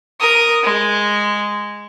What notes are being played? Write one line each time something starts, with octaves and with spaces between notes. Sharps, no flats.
A#4 D#6
G#3